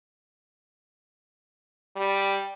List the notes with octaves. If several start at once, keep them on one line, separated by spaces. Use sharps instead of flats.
G3